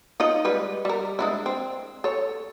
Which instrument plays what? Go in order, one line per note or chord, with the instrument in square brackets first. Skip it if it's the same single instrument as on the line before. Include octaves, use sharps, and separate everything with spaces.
[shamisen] D#4 F4 D#5
G3 G#3 B4
G3 A#4
G#3 D4 E4
C4
A4 C#5